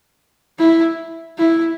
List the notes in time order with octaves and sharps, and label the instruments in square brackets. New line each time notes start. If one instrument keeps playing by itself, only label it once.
[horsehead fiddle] E4
E4